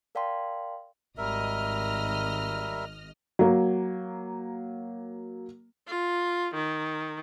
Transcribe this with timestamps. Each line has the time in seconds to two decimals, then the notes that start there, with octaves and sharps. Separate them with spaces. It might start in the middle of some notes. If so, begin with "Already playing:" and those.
0.15 A#4 D5 F5 G5 A5 C6
1.18 G#1 G3 A#4 D#5 E5 F6
3.39 F#3 A#3
5.87 F4
6.54 D#3